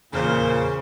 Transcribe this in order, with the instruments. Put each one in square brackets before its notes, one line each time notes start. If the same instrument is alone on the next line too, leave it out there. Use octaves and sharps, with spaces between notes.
[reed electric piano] E2 F6 [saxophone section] A#2 [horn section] C#3 [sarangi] C5